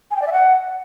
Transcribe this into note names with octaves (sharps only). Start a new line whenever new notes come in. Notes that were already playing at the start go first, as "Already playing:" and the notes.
G#5
G5
D5
E5
F#5